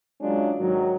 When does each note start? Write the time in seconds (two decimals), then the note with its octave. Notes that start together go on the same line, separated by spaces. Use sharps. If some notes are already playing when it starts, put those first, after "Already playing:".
0.21 F#3 G#3 C#4 D4 F4
0.57 G#2 D#3 F#3